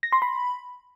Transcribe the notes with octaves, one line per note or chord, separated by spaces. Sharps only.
A#6
C6
B5